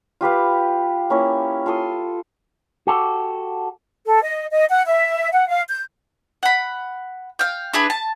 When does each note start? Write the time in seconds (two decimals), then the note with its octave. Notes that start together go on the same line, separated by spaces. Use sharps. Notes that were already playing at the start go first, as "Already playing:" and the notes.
0.21 F4 G4 B4 F5
1.10 A#3 C#4 E4 A#4
1.66 F4 A4 C6 D#6
2.87 F#4 G4 A4
4.06 A4
4.22 D#5
4.52 D#5
4.69 F#5
4.86 E5
5.32 F#5
5.48 F5
5.69 G6
6.43 F#5 B5
7.39 F5 G5
7.73 D4 E4 G#4 B4
7.90 A5